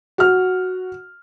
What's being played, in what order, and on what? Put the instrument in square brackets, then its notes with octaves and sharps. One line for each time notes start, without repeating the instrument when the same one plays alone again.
[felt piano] F#4 F6